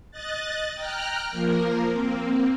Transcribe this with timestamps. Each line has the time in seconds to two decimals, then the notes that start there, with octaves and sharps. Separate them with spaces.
0.11 D#5 F#6 A6
0.75 G5 A#5 F6 F#6
1.31 F3 A#3 A#4
1.93 A#3 C4